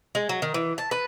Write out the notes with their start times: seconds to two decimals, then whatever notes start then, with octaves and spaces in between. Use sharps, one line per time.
0.15 G#3
0.29 F#3
0.42 D#3
0.54 E3
0.78 A5
0.91 B4